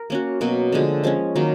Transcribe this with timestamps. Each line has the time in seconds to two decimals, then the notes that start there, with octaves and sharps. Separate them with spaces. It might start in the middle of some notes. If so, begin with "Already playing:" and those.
Already playing: A#4
0.10 A#3 C#4 F#4
0.41 B2 F#3 A#3
0.72 D3 F3 G#3
1.04 F3 G#3 C#4
1.36 D#3 F#3 A#3